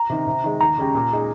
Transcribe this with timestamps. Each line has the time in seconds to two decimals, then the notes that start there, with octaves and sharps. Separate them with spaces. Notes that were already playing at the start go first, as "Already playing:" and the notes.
Already playing: A#5
0.10 C3 D#3
0.27 C3
0.44 D#3 G#3
0.61 D#2 A#5
0.78 C#3 G#3 C#4 G4
0.95 A#2
1.12 G#3 D#4 G#4